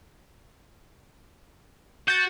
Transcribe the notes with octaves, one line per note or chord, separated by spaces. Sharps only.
F#4 G6 A6